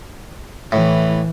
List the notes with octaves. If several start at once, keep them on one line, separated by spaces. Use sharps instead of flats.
A2 E3